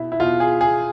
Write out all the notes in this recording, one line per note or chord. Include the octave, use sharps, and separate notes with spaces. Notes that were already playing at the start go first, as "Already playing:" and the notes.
Already playing: B2 E4
E4
B2 F4
G#4
G#4